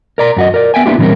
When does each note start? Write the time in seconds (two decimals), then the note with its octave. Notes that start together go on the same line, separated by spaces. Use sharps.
0.18 A#4 D5 A#5
0.36 F#2 F#4 D#5
0.54 A#4 D5
0.74 B3 E5 G5 G#5
0.86 A#3 B3 D4 E4 F4 G4
0.98 A#2 E3 G3 C4 C#4 A#4